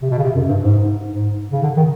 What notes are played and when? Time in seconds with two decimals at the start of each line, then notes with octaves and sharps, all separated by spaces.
0.02 C3
0.11 B2
0.18 C#3
0.23 C3
0.35 F#2
0.48 G2
0.62 G#2
1.13 G#2
1.52 C#3
1.63 D3
1.77 D#3